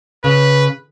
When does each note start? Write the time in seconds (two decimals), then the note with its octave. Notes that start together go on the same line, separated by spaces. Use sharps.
0.24 C#3 B4